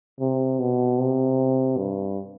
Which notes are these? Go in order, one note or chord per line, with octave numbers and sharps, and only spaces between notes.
C3
B2
C3
G2